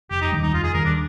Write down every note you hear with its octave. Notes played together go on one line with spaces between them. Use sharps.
F1 G4
D#4
D#2 D#3 G3
D#4
F1 F4
G#4
D#2 D#3 G3 A#4
D4